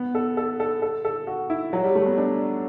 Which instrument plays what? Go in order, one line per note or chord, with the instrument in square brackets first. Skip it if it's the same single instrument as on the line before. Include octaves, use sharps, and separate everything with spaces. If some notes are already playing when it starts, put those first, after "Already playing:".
Already playing: [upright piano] B3
A4
A4
A4
A4
A4
F#4
E4
F#3
G3
A3
B3
D4